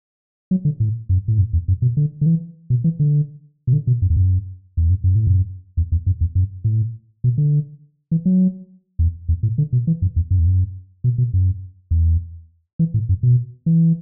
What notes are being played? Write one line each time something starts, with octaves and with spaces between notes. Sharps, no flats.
F#3
D3
A2
F#2
A2
F#2
E2
F#2
B2
D3
D3
E3
B2
E3
D3
B2
D3
B2
F#2
E2
F#2
E2
F#2
F#2
A2
F#2
E2
E2
F#2
E2
F#2
A2
B2
D3
E3
F#3
E2
E2
A2
D3
B2
E3
F#2
E2
F#2
E2
F#2
B2
B2
F#2
E2
E3
A2
F#2
B2
E3